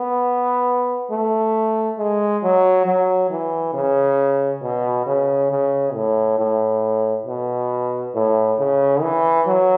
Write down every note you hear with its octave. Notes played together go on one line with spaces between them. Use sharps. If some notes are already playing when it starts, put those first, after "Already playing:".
Already playing: B3
A3
G#3
F#3
F#3
E3
C#3
B2
C#3
C#3
A2
A2
B2
A2
C#3
E3
F#3